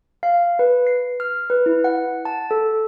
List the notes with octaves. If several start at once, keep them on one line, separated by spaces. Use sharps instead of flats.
F5
B4
C7
F6
B4
E4
F#5
A5
A4